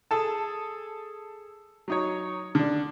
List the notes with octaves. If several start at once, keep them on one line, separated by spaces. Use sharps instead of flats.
G#4 A4 A5
F#3 D#4 C#5
D3 D4